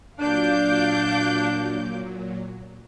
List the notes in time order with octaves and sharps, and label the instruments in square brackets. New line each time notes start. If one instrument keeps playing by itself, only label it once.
[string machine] A#2 F#3 [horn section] D4 [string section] F5 D6 G6